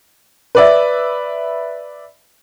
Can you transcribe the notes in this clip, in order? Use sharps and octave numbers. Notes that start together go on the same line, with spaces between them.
B4 D5 E5